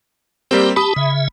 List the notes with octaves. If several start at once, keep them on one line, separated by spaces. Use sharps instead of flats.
G3 A#3 C4 G4
G4 A5 B5 D#6
C#3 E5